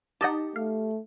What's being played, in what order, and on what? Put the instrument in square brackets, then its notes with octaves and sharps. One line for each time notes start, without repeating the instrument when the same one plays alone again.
[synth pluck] D#4 D#5 A5 [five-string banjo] G4 F#5
[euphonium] A3 [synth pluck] F5